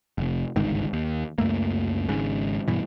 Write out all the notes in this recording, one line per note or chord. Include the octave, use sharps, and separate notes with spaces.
F1
G1 C#2 G#2 D#3
D#2
C#2 F#2 A3 A#3
G#1 G#2 C#3
G2 B2 E3